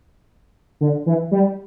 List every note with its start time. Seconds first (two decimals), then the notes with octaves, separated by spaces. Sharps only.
0.81 D3
1.06 E3
1.31 G3